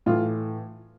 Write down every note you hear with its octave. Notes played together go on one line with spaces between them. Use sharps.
A2 E3 F4